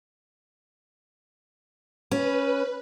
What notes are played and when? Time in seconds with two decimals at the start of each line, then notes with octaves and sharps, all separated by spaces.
2.11 C#4 B4